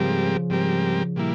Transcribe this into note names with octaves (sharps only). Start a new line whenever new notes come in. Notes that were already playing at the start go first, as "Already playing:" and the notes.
Already playing: G#2 C#3 F3 G3 C4 G4 A#4
G#2 G3 C4 G4 A#4
A#2 G3 A#3 E4